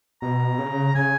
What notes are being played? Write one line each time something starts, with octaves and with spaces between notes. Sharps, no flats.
B2 A#5
C#3
C#3 G#5